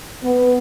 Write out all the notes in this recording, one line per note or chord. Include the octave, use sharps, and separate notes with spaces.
B3